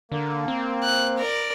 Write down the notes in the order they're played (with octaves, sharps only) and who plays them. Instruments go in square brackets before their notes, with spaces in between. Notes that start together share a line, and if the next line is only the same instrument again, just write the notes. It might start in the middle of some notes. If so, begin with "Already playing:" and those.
[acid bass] D3 [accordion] A#3
[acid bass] C4
[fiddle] F#6
A#4 D5